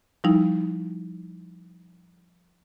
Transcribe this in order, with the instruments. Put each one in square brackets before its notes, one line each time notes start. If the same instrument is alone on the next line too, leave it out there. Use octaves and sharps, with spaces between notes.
[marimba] F3 G3 D#4 E4